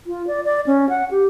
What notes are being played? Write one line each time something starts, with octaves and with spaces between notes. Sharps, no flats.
F4
D5
D5
C#4
F#5
G4